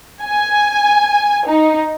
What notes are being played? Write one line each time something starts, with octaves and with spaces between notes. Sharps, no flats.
G#5
D#4